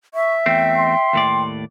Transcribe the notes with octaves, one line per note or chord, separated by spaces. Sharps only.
E5 C#6
E2 A3 C4 G5
C6
D#2 A2 D5